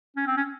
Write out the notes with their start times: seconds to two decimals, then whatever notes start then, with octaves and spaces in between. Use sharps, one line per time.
0.17 C#4
0.27 C4
0.37 C#4